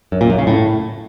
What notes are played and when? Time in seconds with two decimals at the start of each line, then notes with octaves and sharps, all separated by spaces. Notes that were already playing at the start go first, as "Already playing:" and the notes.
0.12 F#2
0.21 A#2
0.30 F#2
0.38 C#3
0.47 A2